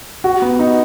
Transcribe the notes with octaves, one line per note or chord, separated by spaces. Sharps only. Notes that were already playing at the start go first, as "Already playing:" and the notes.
F#4
B3
D#4